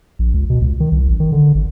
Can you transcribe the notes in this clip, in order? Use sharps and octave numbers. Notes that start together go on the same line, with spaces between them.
A#1
C#2
B2
C#2
D#3
C2
A1
D#3
D3
G#1